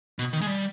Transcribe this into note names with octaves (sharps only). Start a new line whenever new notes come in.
B2
D#3
G#3
G3